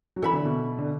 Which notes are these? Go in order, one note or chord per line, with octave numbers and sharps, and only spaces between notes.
F#3
E3 A4 E5 B5
D3
B2
D3